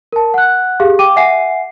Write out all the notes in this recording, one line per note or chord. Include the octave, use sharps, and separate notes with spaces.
A#4 A5
F#5 F#6
G4 G#4 F5
G5 D6 D#7
E5 F#5 G#5 C7